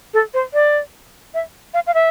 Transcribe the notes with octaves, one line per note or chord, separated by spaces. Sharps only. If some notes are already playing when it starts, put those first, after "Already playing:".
A4
C5
D5
E5
F5
F5
E5